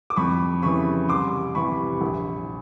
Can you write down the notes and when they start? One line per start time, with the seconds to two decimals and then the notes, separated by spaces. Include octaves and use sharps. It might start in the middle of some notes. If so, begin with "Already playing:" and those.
0.10 D6
0.16 F2 B5 C#6
0.62 C#3 E3 B5 C#6
1.09 C2 C6 D6
1.55 C3 E3 B5 C#6
2.01 A#1